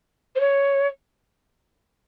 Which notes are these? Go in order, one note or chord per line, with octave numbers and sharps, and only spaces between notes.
C5
C#5